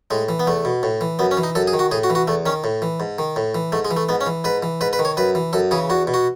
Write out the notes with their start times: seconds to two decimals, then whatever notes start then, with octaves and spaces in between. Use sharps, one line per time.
0.11 A2 G#3
0.29 E3
0.40 B3
0.47 E2 A3
0.65 B2
0.83 A2
1.01 E3
1.19 F#2 B3
1.31 C#4
1.37 E3
1.43 D#4
1.55 F#2 A4
1.67 G#4
1.73 D#3
1.79 F#4
1.91 A2 G#4
2.04 F#4
2.10 E3
2.15 F#4
2.28 E2 A3
2.46 D#3 C#4
2.64 A2
2.82 E3
3.00 G#2
3.18 D#3
3.36 A2
3.55 E3
3.72 G#2 A3
3.85 G#3
3.91 E3
3.97 A3
4.09 G#2 B3
4.21 C#4
4.26 E3
4.44 G#2 B4
4.62 E3
4.81 G#2 B4
4.93 B4
4.99 D#3
5.05 C#5
5.17 F#2 B4
5.35 E3
5.53 F#2 A4
5.71 C#3 E3 G#4
5.90 E2 F#4
6.07 B2
6.14 F#4